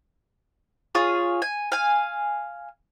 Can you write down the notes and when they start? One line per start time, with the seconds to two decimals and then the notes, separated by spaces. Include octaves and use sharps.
0.95 F4 G#4 C#5
1.42 G#5
1.72 F5 G#5